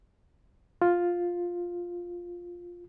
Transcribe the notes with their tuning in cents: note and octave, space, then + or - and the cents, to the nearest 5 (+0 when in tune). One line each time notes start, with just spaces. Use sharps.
F4 +5